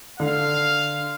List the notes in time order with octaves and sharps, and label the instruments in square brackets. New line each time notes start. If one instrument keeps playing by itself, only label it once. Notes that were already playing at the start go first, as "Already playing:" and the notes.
[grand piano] D3 [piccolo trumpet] F5